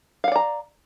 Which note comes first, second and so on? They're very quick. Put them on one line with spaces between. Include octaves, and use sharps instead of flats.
F5 F#5 D5 A#5